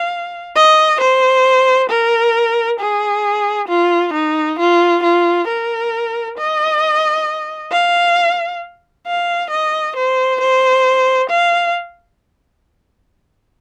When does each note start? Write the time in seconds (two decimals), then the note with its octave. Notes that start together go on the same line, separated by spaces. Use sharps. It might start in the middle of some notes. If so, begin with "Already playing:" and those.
Already playing: F5
0.56 D#5
1.01 C5
1.89 A#4
2.80 G#4
3.69 F4
4.13 D#4
4.59 F4
5.04 F4
5.47 A#4
6.38 D#5
7.72 F5
9.07 F5
9.50 D#5
9.96 C5
10.41 C5
11.30 F5